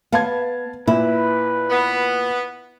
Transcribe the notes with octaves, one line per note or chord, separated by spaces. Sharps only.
B3 F5 A5 G#6
A#2 E4 B4
B3